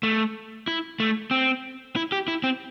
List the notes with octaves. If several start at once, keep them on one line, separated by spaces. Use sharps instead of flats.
A3
E4
A3
C4
E4
G4
E4
C4